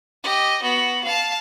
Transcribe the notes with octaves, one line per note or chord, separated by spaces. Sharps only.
G4 D#5
B3 F#4
F5 A5